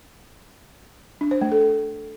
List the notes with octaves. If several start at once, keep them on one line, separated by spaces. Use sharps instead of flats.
D4
C5
A3
A4